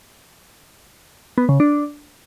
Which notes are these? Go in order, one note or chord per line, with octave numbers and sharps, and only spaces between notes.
B3
C#3
D4